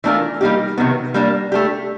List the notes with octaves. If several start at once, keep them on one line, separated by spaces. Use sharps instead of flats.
E3 A3 D4 F4 A#4
G3 A#3 D#4 G4
C3 D#3 F#3 B3
G3 A#3 D4
A3 D4 G4